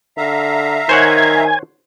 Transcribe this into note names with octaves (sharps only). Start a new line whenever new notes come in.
D3 E5 F5 A#5
D#3 C5 C#5 F#5 G#5